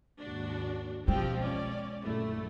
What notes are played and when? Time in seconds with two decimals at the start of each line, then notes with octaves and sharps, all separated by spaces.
0.19 D#2 G#2 D4 F#4
1.08 B2 F3 G#3 C4 G4 G5
1.42 C#4 D5
2.04 A#1 F#2 D3 A3 E4